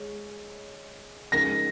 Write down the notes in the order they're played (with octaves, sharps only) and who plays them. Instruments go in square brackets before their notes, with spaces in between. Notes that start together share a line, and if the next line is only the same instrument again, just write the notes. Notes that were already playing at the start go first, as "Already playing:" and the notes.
Already playing: [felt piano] G#3 C#5
[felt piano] C#3 F3 G#3 D#4 A#4 [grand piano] A#6